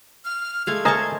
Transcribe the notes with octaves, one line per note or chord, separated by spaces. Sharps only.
F6
G#3 A3 F5 G#6
A#4 C5 D#5 G#5 A5 C#6